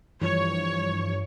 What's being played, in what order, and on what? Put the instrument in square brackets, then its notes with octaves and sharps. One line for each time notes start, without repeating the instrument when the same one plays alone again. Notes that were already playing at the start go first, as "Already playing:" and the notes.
[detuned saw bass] G2 [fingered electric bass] E3 F3 [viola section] C#5